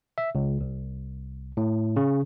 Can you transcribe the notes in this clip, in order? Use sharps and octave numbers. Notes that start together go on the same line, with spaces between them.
E5
C#2
C2
A2
C#3